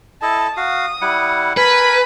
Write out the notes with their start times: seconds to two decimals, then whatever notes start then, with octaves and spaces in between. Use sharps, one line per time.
0.22 E4 A4 D#5 A5
0.57 F#4 F5 D#6
1.01 G3 E4 F#5
1.57 A#4 B4 G#5 B5